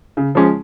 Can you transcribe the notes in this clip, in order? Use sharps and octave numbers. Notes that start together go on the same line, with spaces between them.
C#3
F3 G#3 C#4